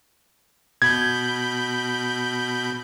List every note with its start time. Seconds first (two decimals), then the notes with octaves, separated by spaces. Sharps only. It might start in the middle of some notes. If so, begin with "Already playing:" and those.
0.82 B2 B5 G6 G#6